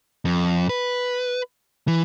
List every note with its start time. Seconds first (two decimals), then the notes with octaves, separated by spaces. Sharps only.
0.25 F2
0.69 B4
1.88 E3